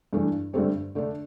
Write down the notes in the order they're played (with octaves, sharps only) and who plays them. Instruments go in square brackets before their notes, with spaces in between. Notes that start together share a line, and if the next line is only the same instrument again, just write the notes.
[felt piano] G2 E3 A3 D4
G2 D3 A3 C4 G4
D3 A3 D4